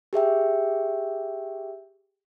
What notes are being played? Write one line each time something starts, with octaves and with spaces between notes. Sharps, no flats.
G4 G#4 E5 G5